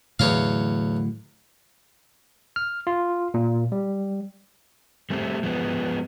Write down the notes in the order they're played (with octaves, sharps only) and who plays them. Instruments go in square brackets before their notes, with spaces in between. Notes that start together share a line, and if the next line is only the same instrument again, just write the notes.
[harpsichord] E2 C#5 F5 [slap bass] A2 D3 F#3
[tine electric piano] F6
F4
A#2
G3
[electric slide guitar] G3 A3 C4
F3 G#3 B3